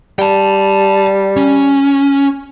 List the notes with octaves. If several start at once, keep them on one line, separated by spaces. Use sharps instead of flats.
G3 G5 A5
C#4